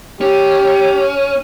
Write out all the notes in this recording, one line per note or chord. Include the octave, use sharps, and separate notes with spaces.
C#4 G4